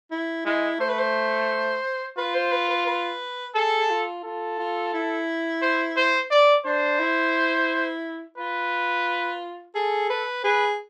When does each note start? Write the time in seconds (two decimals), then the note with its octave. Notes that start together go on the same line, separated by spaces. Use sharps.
0.11 E4
0.45 G#3 E4
0.80 A3 C5
0.89 B4
0.99 C5
2.18 F4 B4
2.35 C5
2.52 B4
2.70 B4
2.86 B4
3.55 G#4 A4
3.80 G#4
3.90 F4
4.24 F4 A4
4.59 F4
4.93 E4
5.62 C5
5.96 C5
6.31 D5
6.65 D4 C5
6.99 E4
8.37 F4 B4
9.75 G#4 A4
10.10 B4
10.44 G#4 B4